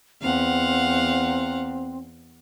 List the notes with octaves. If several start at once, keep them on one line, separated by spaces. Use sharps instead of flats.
E2 C4 F5 F#5